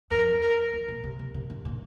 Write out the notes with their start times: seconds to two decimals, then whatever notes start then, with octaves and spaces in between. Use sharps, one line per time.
0.11 F2 A#4
0.42 A#4
0.73 E2
0.88 A#2
1.04 C3
1.19 C3
1.34 C3
1.50 D3
1.65 A#2